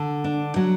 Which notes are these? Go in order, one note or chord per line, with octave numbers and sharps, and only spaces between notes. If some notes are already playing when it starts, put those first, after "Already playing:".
Already playing: D3
D4
F#3